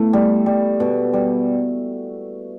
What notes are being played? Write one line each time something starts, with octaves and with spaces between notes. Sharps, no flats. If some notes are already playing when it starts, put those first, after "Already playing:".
Already playing: A3 B3 E4
G3
G3
B2
G3